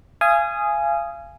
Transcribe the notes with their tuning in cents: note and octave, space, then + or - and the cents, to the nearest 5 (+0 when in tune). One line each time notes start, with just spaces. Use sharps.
F5 -35 G#5 +0 D#6 +0